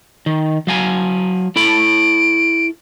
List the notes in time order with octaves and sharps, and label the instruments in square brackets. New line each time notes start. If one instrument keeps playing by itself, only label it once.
[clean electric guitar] D#3
F#3 F5 G#5
[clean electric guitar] E4 A4 B5 [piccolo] D7